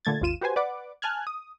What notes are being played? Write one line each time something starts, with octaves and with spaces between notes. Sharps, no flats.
A#2 D3 A3 G#6 A6
G#1 D#2 F4 D#7 E7
F#4 G4 B4 C5 G#5
B4 D5 F#5 D6
G#5 A5 F6 F#6 G#6
D#6